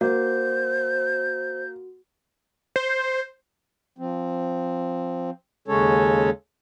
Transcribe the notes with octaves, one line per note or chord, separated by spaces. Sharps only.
A#3 F#4 C5 G6
C5
F3 C4
D#2 C#3 G#3 C#4 A4 C#5